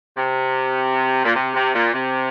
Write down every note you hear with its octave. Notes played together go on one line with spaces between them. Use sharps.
C3
A#2
C3
C3
A#2
C3